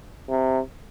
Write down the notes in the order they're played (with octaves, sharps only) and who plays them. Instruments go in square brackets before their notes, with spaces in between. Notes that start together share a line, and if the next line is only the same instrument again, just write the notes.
[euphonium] C3